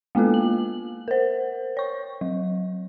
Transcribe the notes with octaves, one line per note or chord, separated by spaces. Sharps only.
G#3 A#3 B3 F4 A4
F#7
A#4 C5
C#5 C#6
F#3